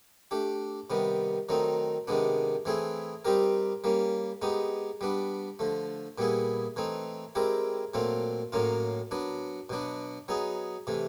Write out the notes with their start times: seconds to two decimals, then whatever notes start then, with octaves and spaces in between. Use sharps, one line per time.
0.31 A3 D4 G4
0.90 C3 D#3 G3 B3
1.49 D#3 F#3 A3 C4 D#4
2.08 C3 D#3 G#3 B3 D4
2.65 E3 A3 C4 E4 G#4
3.25 G3 C4 D#4 G4 A#4
3.84 G3 A#3 C#4
4.42 G#3 B3 D#4 G4
5.01 G3 B3 D4
5.59 D3 F3 A3
6.18 A#2 G3 B3 E4 G#4
6.76 E3 A3 C4 D#4
7.35 G#3 C4 E4 G4 A#4
7.94 A#2 F#3 A3 C4 F4
8.52 A2 F#3 A#3 C#4 F4
9.11 F#3 B3 D4
9.69 B2 F#3 B3 D4
10.28 F#3 B3 D#4 G#4
10.87 C3 E3 A3